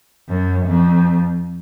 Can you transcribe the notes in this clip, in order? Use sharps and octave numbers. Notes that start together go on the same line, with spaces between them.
F#2
F2